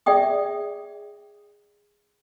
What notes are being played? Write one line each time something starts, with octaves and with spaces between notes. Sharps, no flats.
G#4 D5 E5 G5 D#6